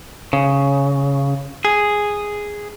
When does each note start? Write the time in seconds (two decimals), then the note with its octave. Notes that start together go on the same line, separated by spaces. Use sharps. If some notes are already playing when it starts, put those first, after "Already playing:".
0.33 C#3
1.65 G#4